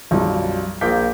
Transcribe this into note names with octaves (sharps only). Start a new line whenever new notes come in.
B1 F#2 F3 G3
A#1 F4 A#4 D6 G6 B6